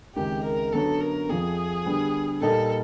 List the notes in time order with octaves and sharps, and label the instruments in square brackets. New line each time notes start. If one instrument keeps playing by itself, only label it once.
[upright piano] C#2 C3 D#3 G#3 [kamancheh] G4
[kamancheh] A#4
[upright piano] F#2 D3 F#3 B3 [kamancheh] A4
[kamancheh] A#4
[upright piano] F2 C3 F3 [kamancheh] G#4
[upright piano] D3 G3 B3
[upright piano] A#2 G3 A#3 D#4 [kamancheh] A4